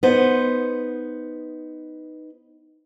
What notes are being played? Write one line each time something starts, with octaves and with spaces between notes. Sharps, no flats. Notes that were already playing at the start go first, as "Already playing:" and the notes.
B3 D#4 C5